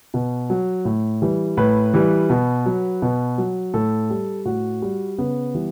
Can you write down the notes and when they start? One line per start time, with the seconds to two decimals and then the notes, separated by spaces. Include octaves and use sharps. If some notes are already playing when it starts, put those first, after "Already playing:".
0.14 B2
0.50 F#3
0.85 A2
1.22 E3 G3
1.57 A2 B4
1.94 E3 G3
2.30 B2
2.66 F#3
3.02 B2
3.38 F#3
3.74 A2 A4
4.10 G3
4.45 A2 F#4
4.82 G3
5.18 C#3 B3
5.54 E3 G3